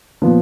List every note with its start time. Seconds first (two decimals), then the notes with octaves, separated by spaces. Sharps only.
0.22 A#2 F3 B3